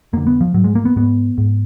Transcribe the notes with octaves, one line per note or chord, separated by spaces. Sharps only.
F2 D3 A#3
B3
F3
G#2 F#3
G#3
A#3
B3
G#2 B3
G#2